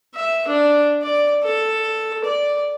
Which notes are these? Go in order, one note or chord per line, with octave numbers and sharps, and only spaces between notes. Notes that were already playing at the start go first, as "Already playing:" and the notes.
E5
D4
D5
A4
D5